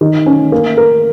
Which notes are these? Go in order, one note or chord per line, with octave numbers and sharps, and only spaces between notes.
D#3
C#4
A#3
A#4